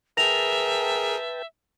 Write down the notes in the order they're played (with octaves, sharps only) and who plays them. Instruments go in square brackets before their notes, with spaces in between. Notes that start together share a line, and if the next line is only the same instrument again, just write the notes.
[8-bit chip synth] G#4 A#4 [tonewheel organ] B4 G5 A5 [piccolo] E5 [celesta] A#6 F7